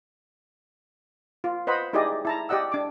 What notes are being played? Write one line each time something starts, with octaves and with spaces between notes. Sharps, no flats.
F4
B4 C5 D#5 F#5 B5
D#4 E4 G4 G#4 D5 D#5
E4 A5 A#5
G4 D5 D#5 F#5 E6
D4 D6